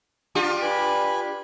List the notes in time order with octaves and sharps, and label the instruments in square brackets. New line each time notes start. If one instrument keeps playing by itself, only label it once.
[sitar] D4 F4 G4
[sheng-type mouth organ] B4 G#5 B5